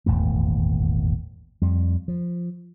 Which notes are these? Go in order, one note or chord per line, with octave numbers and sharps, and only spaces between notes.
D#1 G#1 E2 A3
F2 G3
F3